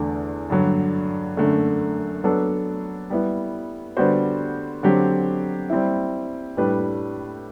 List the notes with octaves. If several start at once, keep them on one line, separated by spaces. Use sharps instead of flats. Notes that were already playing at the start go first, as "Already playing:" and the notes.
Already playing: E2 D3 A3 D4 A4
G2 D3 F#3
F#2 D3 A3
F#3 B3 D4 A4
G3 B3 E4
D3 G3 B3 F#4 C5
D3 F#3 C4 G4
G3 C4 E4
A2 G3 D4 G4 B4